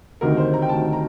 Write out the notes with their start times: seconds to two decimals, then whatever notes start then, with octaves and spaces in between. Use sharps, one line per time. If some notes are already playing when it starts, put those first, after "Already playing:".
0.21 D2 C3 D#3 A#4
0.37 C5
0.54 A#5
0.62 G5
0.69 D2 C3 D#3 A5
0.93 A#5